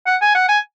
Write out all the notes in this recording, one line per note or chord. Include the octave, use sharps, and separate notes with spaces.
F#5
G#5
F#5
G#5